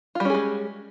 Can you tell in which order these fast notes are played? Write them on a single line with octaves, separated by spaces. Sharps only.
F4 G3 C#4 G#4 G#3